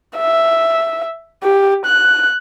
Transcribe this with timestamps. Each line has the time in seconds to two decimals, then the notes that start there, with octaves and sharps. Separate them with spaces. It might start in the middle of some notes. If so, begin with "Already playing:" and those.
0.17 E5
1.43 G4
1.86 F#6